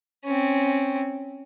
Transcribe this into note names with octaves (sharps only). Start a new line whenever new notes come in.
C4 C#4